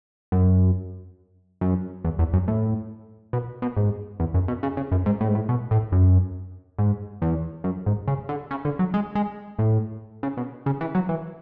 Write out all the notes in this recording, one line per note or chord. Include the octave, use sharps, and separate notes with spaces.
F#2
F#2
E2
E2
F#2
A2
B2
B2
G#2
E2
F#2
B2
C#3
C#3
F#2
G#2
A2
G#2
A2
B2
A2
F#2
G#2
E2
F#2
G#2
C#3
D3
C#3
D3
F#3
G#3
G#3
A2
C#3
B2
C#3
E3
F#3
E3